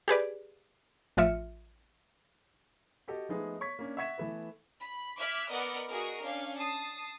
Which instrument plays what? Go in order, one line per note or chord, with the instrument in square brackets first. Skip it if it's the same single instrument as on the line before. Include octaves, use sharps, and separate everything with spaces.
[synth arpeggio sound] G4 G#4 B4 D5
A1 F3 F4 E5 C#7
[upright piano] F#4 G4 A4 D#5
F3 G#3 A3 B3 D#4 G#4
C#5 C#6 G#6 B6
A#3 C#4 D4
E5 F#5 C#6 G#6 B6 E7
E3 A3 B3
[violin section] B5
E5 D6 F6 F#6 G#6 B6
B3 A#4 B4 D5 D#5 F#5
F#4 G#4 A#4 D#5
C#4 D4 F5
A5 D#6 C7